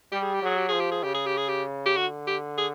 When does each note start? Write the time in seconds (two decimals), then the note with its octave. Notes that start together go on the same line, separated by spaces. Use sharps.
0.12 G3 G4
0.23 G#4
0.34 G4
0.42 F#3 G#4
0.57 G4
0.68 F3 G#4
0.80 G4
0.91 G#4
1.03 C#3 G4
1.14 G#4
1.26 G4
1.37 G#4
1.49 G4
1.86 G4
1.97 D3 F#4
2.28 G4
2.58 G#4